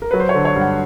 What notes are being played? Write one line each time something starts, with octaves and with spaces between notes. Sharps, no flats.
A#4
F#3 B4
C5
C#5
D3
C#5
G2
F#5